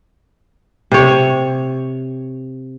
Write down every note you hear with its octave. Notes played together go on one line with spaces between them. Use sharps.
C3 C#5